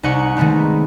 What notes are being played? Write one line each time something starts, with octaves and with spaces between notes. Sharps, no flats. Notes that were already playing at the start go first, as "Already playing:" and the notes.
C2 D#4 F#5 C#6
D#3 G#3 A3 B3 C4